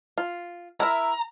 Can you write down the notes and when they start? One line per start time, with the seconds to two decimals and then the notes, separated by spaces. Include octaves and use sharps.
0.18 F4
0.80 E4 A#4 E5 A#5